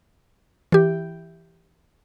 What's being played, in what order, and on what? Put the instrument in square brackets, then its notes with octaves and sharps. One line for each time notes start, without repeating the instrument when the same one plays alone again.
[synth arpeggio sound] E3 G4